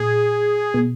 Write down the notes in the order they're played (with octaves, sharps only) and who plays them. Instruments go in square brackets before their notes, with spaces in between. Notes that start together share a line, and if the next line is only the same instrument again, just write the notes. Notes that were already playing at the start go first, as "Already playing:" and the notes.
Already playing: [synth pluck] A#2 [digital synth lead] G#4
[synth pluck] B2